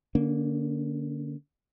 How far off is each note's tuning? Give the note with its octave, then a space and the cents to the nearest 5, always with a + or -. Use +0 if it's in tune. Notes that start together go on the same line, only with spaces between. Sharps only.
D3 +10 A#3 +0 C#4 +35